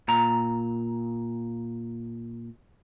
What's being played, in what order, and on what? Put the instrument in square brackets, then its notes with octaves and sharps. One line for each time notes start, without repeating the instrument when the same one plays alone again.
[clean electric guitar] A#2 A#5